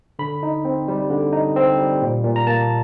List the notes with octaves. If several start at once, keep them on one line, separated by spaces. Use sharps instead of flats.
D3 B5
D#4
C4
G3
D3
D#4
C4
G3
A#2
A#2
A#5
A#3 A5